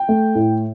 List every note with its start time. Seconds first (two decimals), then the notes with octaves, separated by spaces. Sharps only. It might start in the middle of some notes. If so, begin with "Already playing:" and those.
Already playing: G5
0.09 A3
0.35 A2